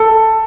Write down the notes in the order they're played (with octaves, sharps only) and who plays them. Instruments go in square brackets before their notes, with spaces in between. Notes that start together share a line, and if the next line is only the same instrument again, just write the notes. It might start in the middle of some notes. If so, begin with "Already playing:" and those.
Already playing: [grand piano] A4